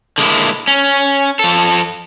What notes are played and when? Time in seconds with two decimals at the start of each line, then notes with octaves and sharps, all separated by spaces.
0.18 D3 G#3 A#3 E4
0.68 C#4
1.39 F3 A4